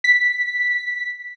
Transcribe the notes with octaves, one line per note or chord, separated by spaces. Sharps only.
B6